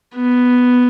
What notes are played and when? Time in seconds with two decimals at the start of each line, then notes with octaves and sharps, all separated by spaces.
0.15 B3